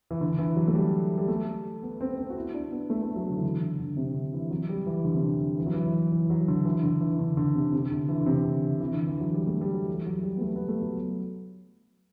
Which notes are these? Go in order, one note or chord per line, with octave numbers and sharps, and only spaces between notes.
E3
D3
E3
F#3
A3
G3
G3
A3
B3
C4
C4
F#4
E4
D4
B3
A3
A3
F#3
D3
E3
D3
D3
D3
C3
D3
E3
F#3
G3
E3
D3
C3
D3
E3
F#3
E3
E3
F#3
D3
E3
D3
E3
D3
D3
C3
C3
D3
E3
D3
C3
D3
D3
E3
D3
E3
F#3
G3
A3
G3
F#3
E3
F#3
G3
B3
A3
B3
A3
F#3